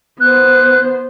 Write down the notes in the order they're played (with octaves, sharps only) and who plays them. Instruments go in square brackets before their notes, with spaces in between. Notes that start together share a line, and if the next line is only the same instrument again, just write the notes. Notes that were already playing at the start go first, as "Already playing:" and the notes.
[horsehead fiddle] B3 C5 [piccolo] F#6